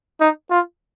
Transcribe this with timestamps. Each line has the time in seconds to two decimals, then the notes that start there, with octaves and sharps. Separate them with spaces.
0.20 D#4
0.51 F4